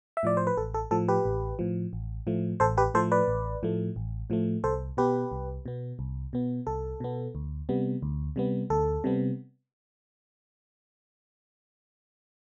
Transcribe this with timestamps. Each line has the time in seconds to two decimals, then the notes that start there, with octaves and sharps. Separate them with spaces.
0.17 E5
0.23 A2 F3 D5
0.37 C5
0.47 B4
0.57 A1 A4
0.74 A4
0.91 A2 F3 A4
1.08 G4 B4
1.25 A1
1.59 A2 F3
1.93 A1
2.27 A2 F3 A3
2.60 A1 A4 C5
2.77 G4 B4
2.94 A2 F3 A3 A4 C5
3.12 B4 D5
3.28 A1
3.63 A2 F3 A3
3.96 A1
4.30 A2 F3 A3
4.64 C2 A4 C5
4.97 B2 B3 G4 B4
5.32 C2
5.66 B2 B3
5.99 C2
6.33 B2 B3
6.67 C2 A4
7.00 B2 B3
7.35 D2
7.69 C3 G3 B3
8.02 D2
8.36 C3 G3 B3
8.70 D2 A4
9.04 C3 G3 B3